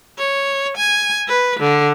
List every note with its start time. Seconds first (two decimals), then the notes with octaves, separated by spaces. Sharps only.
0.18 C#5
0.77 G#5
1.28 B4
1.59 D3